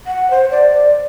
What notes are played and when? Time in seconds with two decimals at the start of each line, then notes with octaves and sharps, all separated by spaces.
0.07 F#5
0.31 C5
0.51 D5